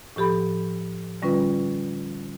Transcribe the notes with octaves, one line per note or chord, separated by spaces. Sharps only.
A2 F3 G4 A4 B5
D3 G3 C#4 F4 B4